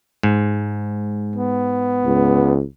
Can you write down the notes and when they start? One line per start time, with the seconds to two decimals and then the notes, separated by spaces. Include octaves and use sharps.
0.23 G#2
1.36 B3
2.05 C#2